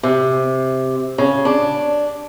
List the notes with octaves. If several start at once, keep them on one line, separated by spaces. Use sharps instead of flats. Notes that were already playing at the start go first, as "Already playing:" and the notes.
C3
C#3
D4